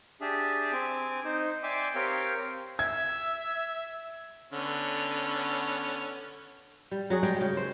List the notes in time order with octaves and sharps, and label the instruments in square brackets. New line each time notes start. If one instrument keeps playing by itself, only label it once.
[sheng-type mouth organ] D4 G4 G#4 E5
C4 G#5 D6
D#4 C5
D5 E5 G5 G#5 C6 D6
C4 G4 A#4 C#5 F5 G5
[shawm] E5 [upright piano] G#6
[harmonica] D3 B3 C#4
[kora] G3
F#3 F#4 G#4
G3 G#3 G5
C#3 G#3 G5
C5